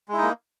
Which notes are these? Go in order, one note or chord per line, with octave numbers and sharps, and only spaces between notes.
G#3 A#3 D#4 E4